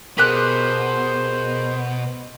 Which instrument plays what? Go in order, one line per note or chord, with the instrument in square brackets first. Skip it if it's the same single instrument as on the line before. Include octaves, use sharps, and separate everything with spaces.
[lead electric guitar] B2 [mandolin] G4 F#6 [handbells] G#4 A#4 [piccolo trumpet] C5